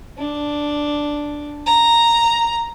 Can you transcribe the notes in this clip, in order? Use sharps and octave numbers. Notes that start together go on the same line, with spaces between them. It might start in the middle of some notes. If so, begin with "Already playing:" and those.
D4
A#5